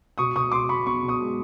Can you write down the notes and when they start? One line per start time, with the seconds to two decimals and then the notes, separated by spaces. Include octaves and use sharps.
0.18 B2 C#6 D#6
0.35 B2 C#6 D#6
0.52 B2 C6 D6
0.69 B2 B5 C#6
0.86 B3 B5 C#6
1.03 B2
1.08 C#6 D#6
1.21 G#3